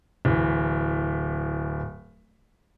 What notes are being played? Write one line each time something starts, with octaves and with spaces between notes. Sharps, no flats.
D1 E3